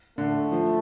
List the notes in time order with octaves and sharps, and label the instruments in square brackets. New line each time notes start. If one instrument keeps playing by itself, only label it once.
[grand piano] D3 [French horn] A3
[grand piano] F3